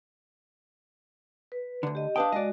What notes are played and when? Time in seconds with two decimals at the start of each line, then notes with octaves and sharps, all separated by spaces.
1.52 B4
1.83 D2 D3
1.95 G4 D#5
2.16 D4 B4 F5 G5 A5 D#6
2.32 G#3 F#4 D5 D#5